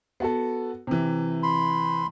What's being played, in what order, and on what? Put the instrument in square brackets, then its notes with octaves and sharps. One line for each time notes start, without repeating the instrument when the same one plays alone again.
[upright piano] B3 F#4 A4
C3 E3
[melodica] B5 C6